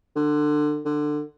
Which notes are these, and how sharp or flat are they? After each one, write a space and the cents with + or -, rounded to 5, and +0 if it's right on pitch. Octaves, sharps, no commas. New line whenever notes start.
D3 +25
D3 +20